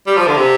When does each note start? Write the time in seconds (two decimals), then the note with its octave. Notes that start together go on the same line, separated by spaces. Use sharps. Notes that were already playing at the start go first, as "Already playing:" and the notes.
0.07 G3
0.16 F3
0.27 D3
0.37 C3